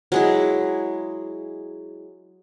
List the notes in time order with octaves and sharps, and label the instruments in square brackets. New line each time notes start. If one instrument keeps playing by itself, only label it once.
[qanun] F#3 G#3 E4